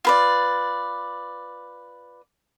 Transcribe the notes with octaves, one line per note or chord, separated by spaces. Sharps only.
F4 B4 D5